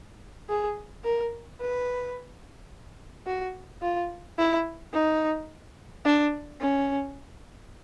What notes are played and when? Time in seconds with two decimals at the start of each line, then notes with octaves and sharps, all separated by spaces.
0.49 G#4
1.04 A#4
1.61 B4
3.27 F#4
3.82 F4
4.38 E4
4.93 D#4
6.05 D4
6.61 C#4